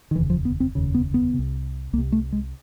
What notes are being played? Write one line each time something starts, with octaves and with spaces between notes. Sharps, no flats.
D#3
F1 D#2 C#3 E3
F3
B3
C4
F1 D#2 C#3
B3
B3
C3
C2
C2 A#3
C3
A3
G#3